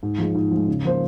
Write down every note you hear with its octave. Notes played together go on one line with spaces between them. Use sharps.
G#2
F3 G#3
G#2
F3 G#3
C#3
F3 A#3 F4 C5